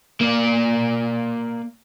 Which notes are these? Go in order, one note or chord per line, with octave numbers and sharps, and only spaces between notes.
A#3 D5